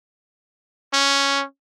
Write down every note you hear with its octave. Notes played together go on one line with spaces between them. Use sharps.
C#4